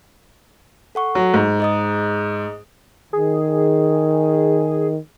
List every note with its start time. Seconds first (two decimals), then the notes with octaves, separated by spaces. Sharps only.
0.95 A4 F#5 C#6
1.15 F#3
1.34 G#2
1.60 G#4 D#5 D#6
3.13 D#3 G#4